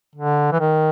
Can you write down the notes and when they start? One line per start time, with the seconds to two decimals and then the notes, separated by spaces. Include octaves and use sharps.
0.15 D3
0.52 E3
0.60 D#3